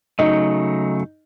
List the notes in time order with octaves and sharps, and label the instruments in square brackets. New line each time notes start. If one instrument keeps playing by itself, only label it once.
[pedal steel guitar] C#3 F#3 A3 [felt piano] D#4 D#5